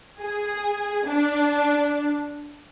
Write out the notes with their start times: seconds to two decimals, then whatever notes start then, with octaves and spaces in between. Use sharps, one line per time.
0.19 G#4
1.06 D4